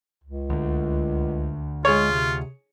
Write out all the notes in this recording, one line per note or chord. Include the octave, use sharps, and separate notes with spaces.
C#2
D2 D3
G#3 F4 G#4 C#5
C3